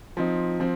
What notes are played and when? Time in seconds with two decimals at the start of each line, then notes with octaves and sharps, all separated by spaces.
0.17 F3 C4 D#4
0.60 F3 C4